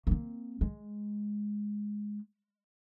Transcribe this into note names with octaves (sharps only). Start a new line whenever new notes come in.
A#3 C4
G#3